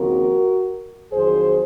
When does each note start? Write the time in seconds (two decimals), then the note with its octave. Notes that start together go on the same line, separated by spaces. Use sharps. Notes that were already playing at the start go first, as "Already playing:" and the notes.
Already playing: D#2 C#3 F3 C4 F#4 A#4
1.12 F2 D#3 F#3 G#4 C5